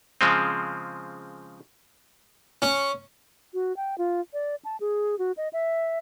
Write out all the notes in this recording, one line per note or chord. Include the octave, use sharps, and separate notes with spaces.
C#3 F3 G#3 C4
C#4
F#4
G5
F4
D5
A5
G#4
F#4
D#5
E5